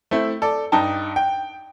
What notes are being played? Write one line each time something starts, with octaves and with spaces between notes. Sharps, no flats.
A3 C4 E4
A4 D5
G2 D#4 G5 A5
G5